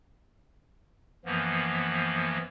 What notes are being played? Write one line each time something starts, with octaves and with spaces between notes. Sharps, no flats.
F#2 E3 F3 A#3 B3